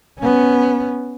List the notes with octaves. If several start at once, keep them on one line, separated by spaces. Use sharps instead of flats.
B3 C#4